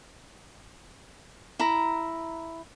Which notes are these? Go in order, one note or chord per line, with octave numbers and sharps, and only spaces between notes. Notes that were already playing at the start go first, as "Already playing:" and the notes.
E4 A#5